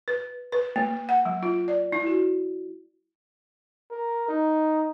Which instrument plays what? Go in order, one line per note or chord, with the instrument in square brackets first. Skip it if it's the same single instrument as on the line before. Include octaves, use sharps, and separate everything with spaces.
[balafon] B4
B4
A#3
F#5
F#3
F4
D5
E4
F#4
[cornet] A#4
D#4